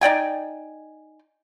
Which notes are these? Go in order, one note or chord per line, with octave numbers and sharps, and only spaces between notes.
D#4 D5 G5 G#5